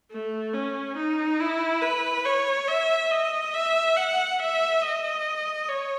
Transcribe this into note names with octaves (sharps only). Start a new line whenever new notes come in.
A3
C#4
D#4
E4
B4
C#5
E5
D#5
E5
F#5
E5
D#5
C#5